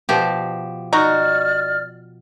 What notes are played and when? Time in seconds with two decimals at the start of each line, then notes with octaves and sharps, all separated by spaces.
0.09 B2 F3 G4
0.93 D#4 F#4 D5 F6